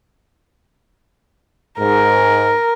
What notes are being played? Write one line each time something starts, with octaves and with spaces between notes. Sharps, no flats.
G#2 A#4